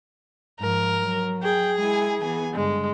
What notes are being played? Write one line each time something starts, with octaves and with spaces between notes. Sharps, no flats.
G#2 F3 A#4
F#3
G#4 G5
G#3 E4 G#5
E3 B3 G#5
G2 D3 G#3